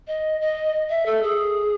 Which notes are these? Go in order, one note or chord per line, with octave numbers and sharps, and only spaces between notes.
D#5
D#5
E5
A4
G#4